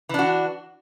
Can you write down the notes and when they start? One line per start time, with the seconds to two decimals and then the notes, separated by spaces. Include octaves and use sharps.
0.09 E3
0.14 D4
0.19 F#4